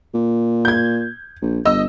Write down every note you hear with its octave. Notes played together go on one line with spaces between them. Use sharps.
A#2
G6 G#6
A#1
G1 D#5 E6